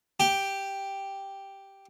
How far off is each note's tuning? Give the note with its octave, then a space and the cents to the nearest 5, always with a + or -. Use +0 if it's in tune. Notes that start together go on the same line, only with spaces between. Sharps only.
G4 +0 G5 +0